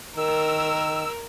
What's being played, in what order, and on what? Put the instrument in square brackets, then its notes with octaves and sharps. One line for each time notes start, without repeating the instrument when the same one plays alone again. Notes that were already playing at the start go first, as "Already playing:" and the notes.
[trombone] D#3 [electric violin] A#4 [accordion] E6